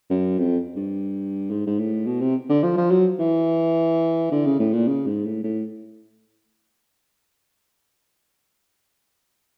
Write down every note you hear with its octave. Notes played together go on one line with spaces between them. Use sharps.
F#2
F2
G2
G#2
G#2
A2
B2
C3
D3
F3
F3
F#3
E3
D3
C#3
A2
A#2
C#3
G#2
A2
A2